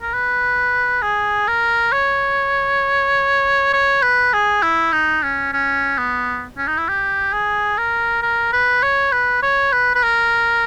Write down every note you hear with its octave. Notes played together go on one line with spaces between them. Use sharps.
A#4
B4
G#4
A#4
C#5
C#5
B4
G#4
E4
D#4
C#4
C#4
B3
C#4
D#4
E4
G4
G#4
A#4
A#4
B4
C#5
B4
C#5
B4
B4
A#4